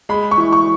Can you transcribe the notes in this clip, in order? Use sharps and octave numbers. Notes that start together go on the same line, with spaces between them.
G#3 B5
C#6
E3
C#6